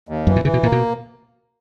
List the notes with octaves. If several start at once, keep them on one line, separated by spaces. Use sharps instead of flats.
D#2
F#2 E3
A#2
C#3 E3
B2
A#2 A#3
B2